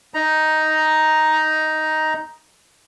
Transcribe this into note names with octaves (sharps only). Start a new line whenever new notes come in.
D#4 A#5